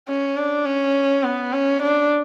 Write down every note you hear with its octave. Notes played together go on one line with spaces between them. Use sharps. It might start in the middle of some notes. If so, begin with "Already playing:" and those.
C#4
D4
C#4
B3
C#4
D4